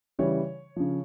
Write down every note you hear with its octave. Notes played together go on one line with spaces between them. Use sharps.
C#3 E3 G3 C#5
C#3 F3